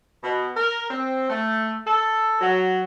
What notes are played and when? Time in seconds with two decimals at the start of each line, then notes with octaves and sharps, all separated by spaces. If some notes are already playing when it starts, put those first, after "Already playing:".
0.24 B2
0.57 A#4
0.90 C4
1.30 A3
1.87 A4
2.41 F#3